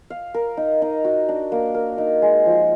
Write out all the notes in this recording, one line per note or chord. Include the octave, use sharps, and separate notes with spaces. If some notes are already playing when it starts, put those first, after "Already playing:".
F5
A#4
D#4
D#4
F#4
D4
A#3
A#4
D#4
G#3
F3